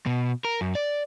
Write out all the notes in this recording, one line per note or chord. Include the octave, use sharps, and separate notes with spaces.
B2
A#4
F#2
D5